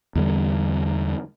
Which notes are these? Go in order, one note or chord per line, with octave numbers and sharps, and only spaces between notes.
E2 D3 G3